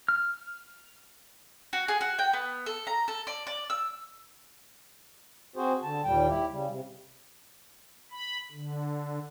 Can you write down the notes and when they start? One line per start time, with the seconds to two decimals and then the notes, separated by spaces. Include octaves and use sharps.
0.08 F6
1.73 F#4
1.88 G#4
2.01 F#4
2.19 G5
2.33 B3
2.66 A4
2.87 A#5
3.08 A4
3.27 D5
3.47 D5
3.70 E6
5.56 C4 F#4 G#4 C5
5.83 D3 A5
6.04 D#2 A#2 G3 G5
6.28 E4 G4
6.51 C#3 G3
6.67 C3
8.11 B5
8.52 D3